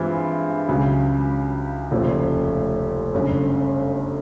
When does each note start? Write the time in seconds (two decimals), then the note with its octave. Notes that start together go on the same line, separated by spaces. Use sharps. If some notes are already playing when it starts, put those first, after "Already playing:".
Already playing: G2 E3 G#3 C4 F4
0.68 C#2 C#3 F#3
1.91 F1 D#2 C#3 F3 A3
3.14 G1 F#2 C#3